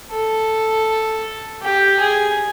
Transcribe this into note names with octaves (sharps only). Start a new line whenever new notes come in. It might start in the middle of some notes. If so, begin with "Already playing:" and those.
A4
G4
G#4